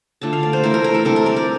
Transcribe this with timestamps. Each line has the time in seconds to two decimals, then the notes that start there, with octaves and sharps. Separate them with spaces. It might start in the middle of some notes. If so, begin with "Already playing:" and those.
0.21 D3 A3 D4 F4 A5
0.33 F5
0.43 D5
0.53 C5
0.63 E3 A3 E4 A#4
0.74 A#4
0.84 A#4
0.94 A4
1.05 C3 G3 D4 A#4
1.16 A#4
1.26 D5
1.36 A#4